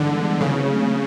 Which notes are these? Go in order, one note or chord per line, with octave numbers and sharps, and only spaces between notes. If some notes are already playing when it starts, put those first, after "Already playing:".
Already playing: G2 D3 E3 G#3 B3 D#4
C#3 F#3 A3 C4